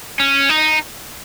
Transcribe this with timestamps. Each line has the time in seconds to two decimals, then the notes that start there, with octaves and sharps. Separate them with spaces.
0.20 C#4
0.49 D#4